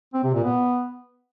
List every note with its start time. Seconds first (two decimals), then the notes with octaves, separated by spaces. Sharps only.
0.14 C4
0.24 C3
0.34 A#2
0.44 B3